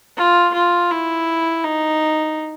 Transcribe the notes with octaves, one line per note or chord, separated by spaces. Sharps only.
F4
F4
E4
D#4